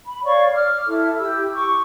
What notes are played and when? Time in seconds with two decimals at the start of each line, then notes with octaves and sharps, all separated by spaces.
0.06 B5
0.24 C#5 D5 F5 C#6
0.52 D6 F6
0.86 E4 A4
1.18 E4 G4 E6
1.53 C#6 D6